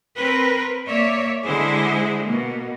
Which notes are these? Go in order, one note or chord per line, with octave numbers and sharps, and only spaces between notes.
C4 A#4 B4
A#3 C#5 D5 E5
D3 G#3 E4 G#4 C5
B2 A#3